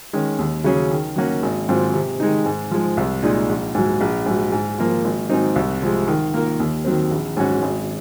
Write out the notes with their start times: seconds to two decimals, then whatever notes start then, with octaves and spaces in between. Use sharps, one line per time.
0.13 D#3 G#3 C#4
0.39 D#2
0.64 C#3 F#3 C#4 G#4
0.91 D#3
1.16 F#3 A#3 C#4 F#4
1.42 G#1
1.69 G#2 F#3 C4 F4
1.93 C3
2.20 D#3 G#3 D#4
2.45 G#2
2.71 F3 G#3
2.97 C2
3.23 A#2 G#3 D#4
3.49 A#1
3.75 G#2 F#3
4.01 A#1
4.26 G#2 F#3
4.52 G#2
4.78 F3 A#3 F4
5.04 G#1
5.29 G#2 F#3 C4 D#4
5.56 C2
5.82 C3 F3 G#3
6.08 D#3
6.34 A#3 F4 A#4
6.60 D#2
6.84 D#3 F#3 C4
7.11 A#1
7.37 G#2 F#3 C#4 F#4
7.62 G#1